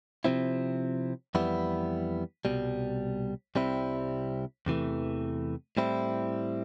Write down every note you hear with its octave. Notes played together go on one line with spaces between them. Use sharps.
C3 F3 C4 E4
F2 E3 G3 B3 E4
C2 B2 G3
C2 C3 G3 C4 E4
E2 C3 E3 A3
A2 G3 C4 E4